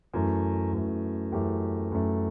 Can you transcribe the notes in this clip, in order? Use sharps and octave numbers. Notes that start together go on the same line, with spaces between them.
F#2 E3 A3
F#2 E3 A3
F#2 E3 A3 G4
F#2 E3 A3